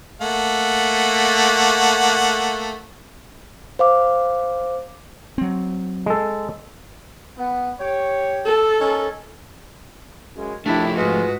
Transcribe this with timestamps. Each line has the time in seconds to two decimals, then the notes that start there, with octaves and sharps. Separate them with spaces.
0.21 A3 A#3 F#5
3.79 C5 F5 D6
5.38 F#3 C4
6.06 G#3 A4
7.38 B3
7.80 G4 C#5
8.46 A4
8.80 C#4 D#4 A#4
10.36 F#2 C#3 G#3
10.66 A2 D#3 F3 A3 D4 E4 G4
10.96 G#2 G#3 F4 F#4 B4